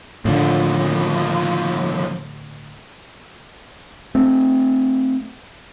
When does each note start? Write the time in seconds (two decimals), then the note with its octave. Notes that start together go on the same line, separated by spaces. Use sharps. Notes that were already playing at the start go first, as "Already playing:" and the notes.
0.25 D#2 A2 D3 F3
4.15 A3 C4